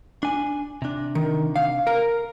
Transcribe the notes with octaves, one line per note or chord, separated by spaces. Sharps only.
D4 G#5
C3 D4
D#3
F5
A#4